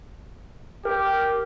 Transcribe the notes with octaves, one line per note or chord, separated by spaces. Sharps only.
G4 A#4